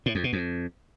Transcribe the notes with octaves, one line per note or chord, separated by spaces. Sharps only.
A2
F2
B2
F2